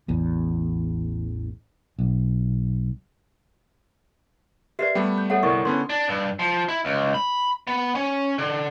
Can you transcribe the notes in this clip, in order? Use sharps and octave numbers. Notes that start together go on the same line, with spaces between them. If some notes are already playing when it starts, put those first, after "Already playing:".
A1 E2
B1
G4 A#4 B4 D5 E5 C7
G3 A3 B3 G5
G6
A4 C#5 E5 F#5
G1 C2 E4 A#4 D5 C#6
D3 B3 C#4 C6
D4
G2
F3
E4
C#2
B5
B3
C#4
D3